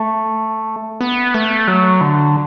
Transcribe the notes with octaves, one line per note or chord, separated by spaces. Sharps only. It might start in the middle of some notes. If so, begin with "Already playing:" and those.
Already playing: A3
B3
A3
F#3
D3